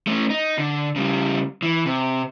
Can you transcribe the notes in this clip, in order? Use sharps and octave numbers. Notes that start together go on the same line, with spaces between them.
A3 C#4
D#4
D3
C#3 G3
E3
C3